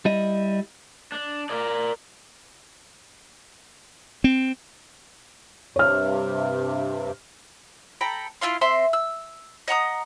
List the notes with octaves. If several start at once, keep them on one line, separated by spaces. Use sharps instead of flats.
G3 E4 D#5
D4
A#4 D5
C4
G2 C3 C#5 F6
A4 G5 A#5 B5
E4 F4 F5 C6
C4 E5 C6
E6
D#5 F#5 A#5 D#6